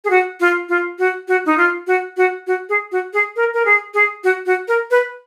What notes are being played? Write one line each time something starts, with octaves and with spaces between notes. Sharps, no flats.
G#4
F#4
F4
F4
F#4
F#4
D#4
F4
F#4
F#4
F#4
G#4
F#4
G#4
A#4
A#4
G#4
G#4
F#4
F#4
A#4
B4